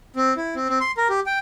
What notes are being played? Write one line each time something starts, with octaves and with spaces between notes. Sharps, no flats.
C4
E4
C4
C4
C6
A#4
G4
G5